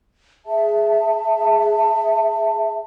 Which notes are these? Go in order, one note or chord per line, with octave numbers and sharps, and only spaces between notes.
G#4 E5 A5